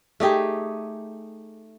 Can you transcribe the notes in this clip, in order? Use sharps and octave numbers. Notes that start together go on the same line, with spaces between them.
A3 D#4 G4 G#4